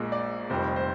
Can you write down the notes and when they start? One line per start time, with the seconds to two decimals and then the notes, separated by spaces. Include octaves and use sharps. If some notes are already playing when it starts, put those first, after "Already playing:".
Already playing: A#1 A#2 G#3
0.12 D5
0.50 F1 F2 D#3 G3 C5
0.76 C5